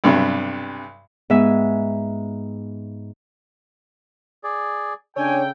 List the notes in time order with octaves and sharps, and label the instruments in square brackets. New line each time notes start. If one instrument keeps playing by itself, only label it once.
[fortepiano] B1 G2 C3
[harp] G#2 B3 E5 G#5
[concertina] G#4 D5
[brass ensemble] C#3 G5 [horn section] D4 G#5 [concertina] A4 [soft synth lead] C#5